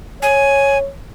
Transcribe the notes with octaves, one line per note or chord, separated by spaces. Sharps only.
C#5 G#5